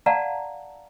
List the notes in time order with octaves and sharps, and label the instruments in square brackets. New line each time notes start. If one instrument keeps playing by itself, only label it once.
[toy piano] D5 F5 F#5 A5 A#5